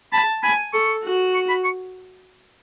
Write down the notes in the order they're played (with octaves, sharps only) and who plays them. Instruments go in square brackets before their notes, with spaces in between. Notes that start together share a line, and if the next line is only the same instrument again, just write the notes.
[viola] A5 [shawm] B5
[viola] G#5 [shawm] B5
[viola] A4 [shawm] C#6
[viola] F#4
[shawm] C#6
B5
C#6